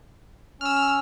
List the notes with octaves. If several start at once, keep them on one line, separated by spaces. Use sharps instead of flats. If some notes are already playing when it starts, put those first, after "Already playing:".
C#4 E6 F6